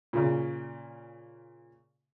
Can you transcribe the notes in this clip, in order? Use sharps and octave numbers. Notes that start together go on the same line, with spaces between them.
A#2 C#3